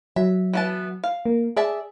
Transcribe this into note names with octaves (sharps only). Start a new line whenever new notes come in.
F#3 E5
E3 B3 A5
F5
A#3
G#4 D5 E5 A5